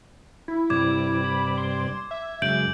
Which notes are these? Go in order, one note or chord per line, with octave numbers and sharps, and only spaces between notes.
E4
G2 C3 D5 D6 G#6
B5
C6
E5
F#2 C#3 G#3 G6 D7 F#7